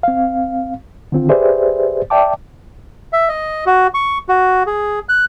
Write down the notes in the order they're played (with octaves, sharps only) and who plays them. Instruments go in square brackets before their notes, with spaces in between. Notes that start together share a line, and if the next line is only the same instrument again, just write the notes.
[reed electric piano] C4 F5
D3 D#3 C4 F4
G4 G#4 B4 C5 D5 E5
D5 E5 G5 A5 D6
[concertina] E5
D#5
F#4
C#6
F#4
G#4
F#6